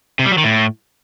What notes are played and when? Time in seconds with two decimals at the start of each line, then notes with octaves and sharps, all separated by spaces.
0.19 C3
0.25 G3
0.32 F#3
0.38 D#3
0.44 A2